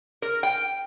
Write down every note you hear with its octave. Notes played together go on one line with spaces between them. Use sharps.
A#4
G5